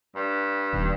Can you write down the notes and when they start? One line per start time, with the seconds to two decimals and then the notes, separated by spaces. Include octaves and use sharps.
0.15 G2
0.73 D#1